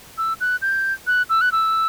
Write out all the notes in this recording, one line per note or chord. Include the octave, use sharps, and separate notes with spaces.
E6
F#6
G6
F#6
E6
F#6
E6